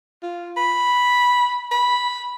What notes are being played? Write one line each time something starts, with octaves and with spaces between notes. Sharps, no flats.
F4
B5
B5